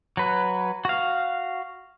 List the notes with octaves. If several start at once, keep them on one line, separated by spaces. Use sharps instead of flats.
F#3 B4
F#4 F5